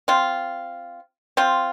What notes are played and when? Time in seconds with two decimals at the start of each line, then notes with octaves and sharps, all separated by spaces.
0.08 C4 F4
1.37 C4 F4